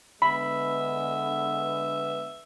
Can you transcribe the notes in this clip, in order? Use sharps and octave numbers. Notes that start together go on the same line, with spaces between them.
D3 G#3 B3 E5 B5